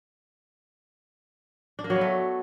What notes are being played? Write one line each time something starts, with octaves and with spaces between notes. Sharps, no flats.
D4
A#3
F#3
B3
A3